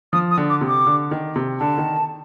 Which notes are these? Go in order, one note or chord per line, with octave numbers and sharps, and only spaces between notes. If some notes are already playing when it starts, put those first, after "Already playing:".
F3 D#6
D#6
D3
D6
C3
D6
D3
D#3
C3
D3 A5
D#3